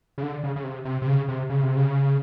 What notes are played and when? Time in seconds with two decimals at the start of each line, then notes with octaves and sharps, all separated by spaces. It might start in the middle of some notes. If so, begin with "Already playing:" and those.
0.18 C#3
0.23 D3
0.44 C#3
0.56 C#3
0.64 C3
0.85 C3
1.02 C3
1.07 C#3
1.28 C3
1.50 C#3
1.63 C3
1.77 C#3